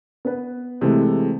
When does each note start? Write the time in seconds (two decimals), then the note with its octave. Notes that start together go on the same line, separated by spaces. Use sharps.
0.25 B3 B4
0.81 C3 E3 G#3 A3